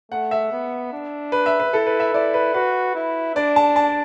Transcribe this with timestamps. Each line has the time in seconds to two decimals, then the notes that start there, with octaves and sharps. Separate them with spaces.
0.11 A3 F#5
0.31 E5
0.52 B3
0.93 D4
1.32 B4
1.46 E5
1.60 B4
1.73 E4 A4
1.87 B4
2.00 E5
2.13 E4 D5
2.34 B4
2.54 F#4 B4
2.95 E4
3.35 D4 D5
3.56 A5
3.76 A5